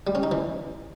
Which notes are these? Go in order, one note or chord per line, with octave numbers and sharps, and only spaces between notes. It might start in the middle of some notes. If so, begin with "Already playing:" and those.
G3
C#4
D#4
E3